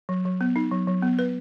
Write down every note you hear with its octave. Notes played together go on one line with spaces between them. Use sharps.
F#3
F#3
B3
D#4
F#3
F#3
B3
B4